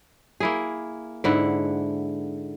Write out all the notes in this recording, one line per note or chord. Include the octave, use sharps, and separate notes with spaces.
A#3 E4 G#4
G#2 D3 E4 F#5